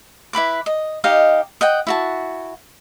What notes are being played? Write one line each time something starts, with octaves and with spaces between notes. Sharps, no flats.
E4 B4 B5 D6
D#5
D#4 G4 D#5 F5
D#5 F#5 G5
E4 F#4 A5